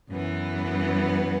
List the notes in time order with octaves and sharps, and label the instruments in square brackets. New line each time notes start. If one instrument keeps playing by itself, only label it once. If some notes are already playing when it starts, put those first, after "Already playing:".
[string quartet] F#2 E3 B3